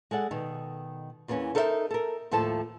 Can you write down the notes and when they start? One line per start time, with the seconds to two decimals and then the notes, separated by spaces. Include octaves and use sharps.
0.11 G#3 A4 D5 F#5
0.31 B2 D#3 D#4
1.28 E2 E3 A#3 B3 C#4
1.55 D#4 A4 A#4 C5 C#5 E5
1.91 A4 A#4
2.31 D#2 A2 F3 A4 C5 A5